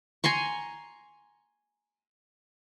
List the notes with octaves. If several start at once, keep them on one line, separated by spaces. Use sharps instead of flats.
G#5 A#5 C6 C#6